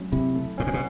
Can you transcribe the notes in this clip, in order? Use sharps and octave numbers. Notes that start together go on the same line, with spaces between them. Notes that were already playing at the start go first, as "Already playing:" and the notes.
Already playing: F#3 A3 C#4
C3 E4
A3
A2 C#4
A#2
B2